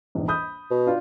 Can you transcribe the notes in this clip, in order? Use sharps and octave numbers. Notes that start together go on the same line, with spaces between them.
A#1 E2 G#2
B5 D#6 G6
B2
D4 F4